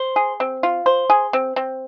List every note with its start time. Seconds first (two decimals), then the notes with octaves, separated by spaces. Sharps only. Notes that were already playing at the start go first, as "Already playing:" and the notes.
Already playing: C5
0.16 G#4
0.40 C4
0.63 F4
0.86 C5
1.10 G#4
1.33 C4
1.56 C4